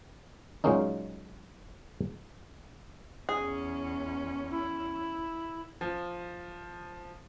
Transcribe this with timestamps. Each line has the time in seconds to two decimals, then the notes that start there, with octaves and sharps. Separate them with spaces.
0.64 A#2 F#3 G#3 A#3 C#4 D#4
3.29 E2 C#4 G#4
4.51 E4
5.81 F3